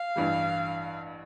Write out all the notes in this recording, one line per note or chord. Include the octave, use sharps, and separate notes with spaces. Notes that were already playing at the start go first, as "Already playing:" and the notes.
Already playing: F5
A1 G2 E3 G3